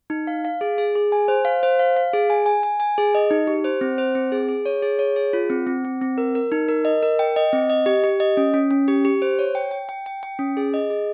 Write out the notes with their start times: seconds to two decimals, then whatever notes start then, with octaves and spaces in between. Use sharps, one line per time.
0.10 D#4
0.27 F5
0.45 F5
0.61 G#4
0.78 G#4
0.95 G#4
1.12 G#5
1.28 C5
1.45 F5
1.63 C5
1.79 F5
1.97 F5
2.13 G#4
2.30 G#5
2.46 G#5
2.63 G#5
2.80 G#5
2.98 G#4
3.15 D#5
3.31 D#4
3.47 G4
3.64 C5
3.81 C4
3.98 C5
4.15 C4
4.32 G#4
4.49 G#4
4.65 C#5
4.83 G#4
4.99 C#5
5.16 G#4
5.33 F4
5.50 C4
5.66 C4
5.85 C4
6.01 C4
6.18 A#4
6.35 A#4
6.52 D#4
6.68 A#4
6.85 D#5
7.03 A#4
7.19 G5
7.36 D#5
7.53 C4
7.70 D#5
7.86 G4
8.04 G4
8.20 D#5
8.37 C#4
8.54 C#4
8.71 C#4
8.88 G4
9.05 G4
9.22 C5
9.39 C#5
9.55 G5
9.71 G5
9.89 G5
10.06 G5
10.23 G5
10.39 C#4
10.57 G#4
10.74 D#5
10.90 G#4